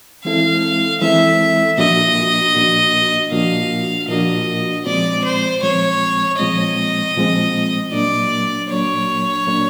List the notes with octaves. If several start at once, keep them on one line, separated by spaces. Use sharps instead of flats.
E3 G#3 C4 E4 A4 F5
E3 G#3 C4 E4 A4 E5
A#2 F3 A#3 D4 F#4 D#5
A#2 F3 A#3 D4 F#4
A#2 F3 A#3 D4 F#4 F5
A#2 F3 A#3 D4 F#4 D#5
A#2 F3 G#3 C4 D5
C5
A#2 F3 G#3 C4 C#5
A#2 F3 G#3 C4 D#5
A#2 F3 G#3 C4
A#2 F#3 A#3 D4 D5
A#2 F#3 A#3 D4 C#5
A#2 F#3 A#3 D4